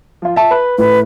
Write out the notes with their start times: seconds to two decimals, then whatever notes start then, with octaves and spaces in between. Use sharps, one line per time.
0.22 F3 F4
0.36 E5 A5
0.51 B4
0.78 A2 B4